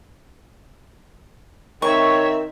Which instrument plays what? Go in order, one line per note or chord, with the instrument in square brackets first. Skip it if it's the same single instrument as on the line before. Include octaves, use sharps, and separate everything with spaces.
[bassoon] D#3 [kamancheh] C4 E5 [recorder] C#5 [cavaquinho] C#6